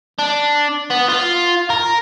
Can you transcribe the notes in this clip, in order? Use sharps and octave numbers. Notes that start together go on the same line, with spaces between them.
D4
B3
F4
A#4